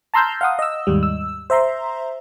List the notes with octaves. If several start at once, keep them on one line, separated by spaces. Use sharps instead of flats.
A5 A#5 C6 E6 F6 G6
F5 F#5 D#6
D#5 E6
D#2 G#2 G3
E6
C5 E5 A#5 C6